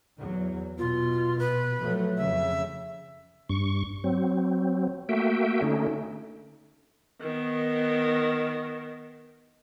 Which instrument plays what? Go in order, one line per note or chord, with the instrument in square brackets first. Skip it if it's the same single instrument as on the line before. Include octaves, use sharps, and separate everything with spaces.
[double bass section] E2 F#3
[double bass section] B2 [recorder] F4
[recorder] B4
[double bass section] F3 F#3 A3
[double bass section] F2 C#3 [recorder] E5
[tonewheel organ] G2 C#6
F#3 C4
A3 A#3 F#4 E5 G5
D3 A3 C#4 D#4
[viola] D#3 B3